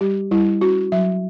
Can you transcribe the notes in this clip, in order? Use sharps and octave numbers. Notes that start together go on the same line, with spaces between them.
G3 G4
G3 E4
C#4 F#4
F#3 E5